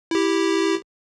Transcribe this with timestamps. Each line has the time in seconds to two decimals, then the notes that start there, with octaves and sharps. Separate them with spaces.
0.11 E4 G4